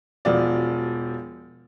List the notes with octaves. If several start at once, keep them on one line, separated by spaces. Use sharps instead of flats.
E1 F3 D5